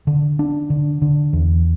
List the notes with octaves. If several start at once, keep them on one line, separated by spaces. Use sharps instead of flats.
D3
D4
D3
D3
E2